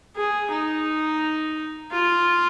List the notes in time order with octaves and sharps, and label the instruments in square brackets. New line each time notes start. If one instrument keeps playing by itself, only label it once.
[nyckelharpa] G#4
D#4
F4